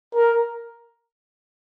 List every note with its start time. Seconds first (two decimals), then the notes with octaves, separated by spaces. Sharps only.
0.15 A#4